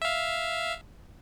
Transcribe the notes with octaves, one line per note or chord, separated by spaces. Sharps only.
E5 F5